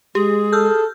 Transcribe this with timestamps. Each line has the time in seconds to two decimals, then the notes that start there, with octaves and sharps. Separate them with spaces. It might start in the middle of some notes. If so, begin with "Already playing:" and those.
0.15 G#3 G4 G#4
0.53 A4 E6 F6 G6